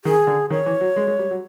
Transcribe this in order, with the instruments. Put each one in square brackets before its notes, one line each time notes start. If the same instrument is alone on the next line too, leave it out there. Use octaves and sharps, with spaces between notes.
[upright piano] D#3 [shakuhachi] G#4
[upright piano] D3
[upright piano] D#3 [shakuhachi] C#5
[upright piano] E3
F#3
G#3
G#3
G3
F#3